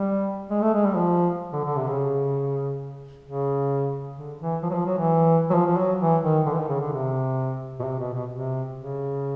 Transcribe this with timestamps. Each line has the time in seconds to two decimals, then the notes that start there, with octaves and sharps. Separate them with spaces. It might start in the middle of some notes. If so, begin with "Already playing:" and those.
Already playing: G3
0.50 G#3
0.61 A3
0.73 G#3
0.85 G3
0.96 F3
1.53 D3
1.65 D3
1.76 C3
1.88 C#3
3.25 C#3
4.16 D3
4.40 E3
4.62 F3
4.70 F#3
4.74 F3
4.86 F#3
4.98 E3
5.50 F#3
5.54 F3
5.66 F3
5.77 F#3
6.00 E3
6.23 D#3
6.46 D3
6.53 E3
6.58 D#3
6.69 C#3
6.81 D3
6.92 C3
7.79 B2
7.84 C3
7.99 B2
8.14 B2
8.30 C3
8.76 C#3